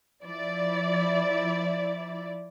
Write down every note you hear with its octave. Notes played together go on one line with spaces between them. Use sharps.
F3 E4 D5